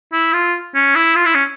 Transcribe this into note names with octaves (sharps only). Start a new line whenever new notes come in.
E4
F4
C#4
E4
F4
E4
C#4